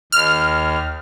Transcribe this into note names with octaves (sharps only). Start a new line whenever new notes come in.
D#2 F6